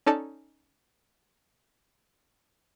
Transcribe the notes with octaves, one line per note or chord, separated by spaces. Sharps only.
C#4 D#4 A4 D5 A5